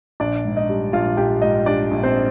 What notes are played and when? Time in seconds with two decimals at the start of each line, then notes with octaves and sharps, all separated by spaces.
0.20 A#1 D4 D5
0.45 G#2
0.57 D#4 D#5
0.69 G3
0.93 A#1 F4 F5
1.17 A#1 G4 G5
1.42 G#2 D#4 D#5
1.66 G3 D4 D5
1.91 A#1
2.03 C4 C5